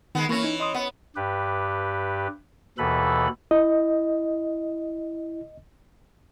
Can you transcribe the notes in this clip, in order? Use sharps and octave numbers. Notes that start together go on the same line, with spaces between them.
D#3 G#3 B3
E3 A#3 C#4 C#6 A#6
D#4
D#5 C6 D#6
B3
G2 G4 B4
D#2 B2 E3 A4 B4 B5
E4 D#5